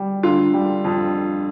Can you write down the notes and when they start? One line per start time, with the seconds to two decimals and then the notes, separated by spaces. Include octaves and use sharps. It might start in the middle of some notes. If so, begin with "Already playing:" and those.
Already playing: G3
0.23 D3 F4
0.54 G3
0.84 F2